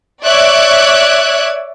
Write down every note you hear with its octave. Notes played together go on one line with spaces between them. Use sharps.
C#5 D5 E5 D6 F#6 G#6